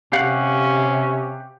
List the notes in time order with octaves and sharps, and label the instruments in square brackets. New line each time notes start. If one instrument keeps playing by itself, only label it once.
[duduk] C3 [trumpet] C#4 [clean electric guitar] G4 F5 F#5